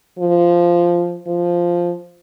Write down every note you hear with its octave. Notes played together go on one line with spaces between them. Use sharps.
F3
F3